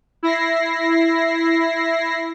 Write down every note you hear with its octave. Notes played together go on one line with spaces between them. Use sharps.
E4 A#6 C7